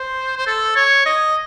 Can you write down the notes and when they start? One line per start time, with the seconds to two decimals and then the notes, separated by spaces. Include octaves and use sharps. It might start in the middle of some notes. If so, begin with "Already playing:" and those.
Already playing: C5
0.37 C5
0.47 A4
0.76 C#5
1.06 D#5